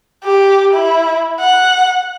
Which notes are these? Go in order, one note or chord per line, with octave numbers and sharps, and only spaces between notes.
G4
E4
F#5